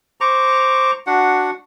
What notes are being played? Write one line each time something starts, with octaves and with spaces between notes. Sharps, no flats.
C5 A#5 C#6 D6
D4 F#4 F#5